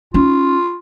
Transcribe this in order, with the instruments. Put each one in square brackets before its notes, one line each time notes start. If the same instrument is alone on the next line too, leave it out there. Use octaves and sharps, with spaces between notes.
[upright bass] C#4 D#4 [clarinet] F4